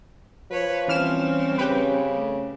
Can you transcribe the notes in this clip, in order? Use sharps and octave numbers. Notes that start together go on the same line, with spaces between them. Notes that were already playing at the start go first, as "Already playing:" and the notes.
F3 B4 C#5
E3 G3 C4 C#4 F6 E7
C#3 C#4 G4 B4
A3